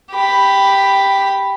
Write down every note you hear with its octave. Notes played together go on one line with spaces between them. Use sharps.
G4 B5